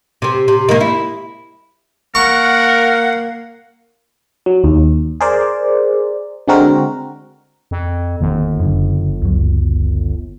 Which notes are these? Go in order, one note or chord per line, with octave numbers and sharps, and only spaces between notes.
C3 C4
C3
D#3 A#3
E4
A#3 A#4 F#5 C#6
F#3
D#2
G#4 A#4 C5 D5
D3 G#3 C4 F#4 A#4
F2
G1 E2 D#3 A#3
F#1 F#2 D3
C#2 F#2 F#3